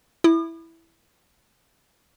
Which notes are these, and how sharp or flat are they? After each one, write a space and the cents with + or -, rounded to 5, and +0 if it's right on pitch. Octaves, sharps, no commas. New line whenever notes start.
E4 +0 D#6 -45